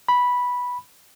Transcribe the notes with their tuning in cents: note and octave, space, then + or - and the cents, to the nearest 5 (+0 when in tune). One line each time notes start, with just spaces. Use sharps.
B5 -5